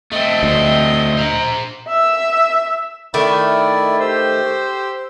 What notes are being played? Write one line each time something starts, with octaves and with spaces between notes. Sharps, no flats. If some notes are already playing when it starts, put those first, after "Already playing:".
A3 C4 D#5
D2
C5 A#5
E5 E6
D#3 A3 E4 D5
G4 C5 E6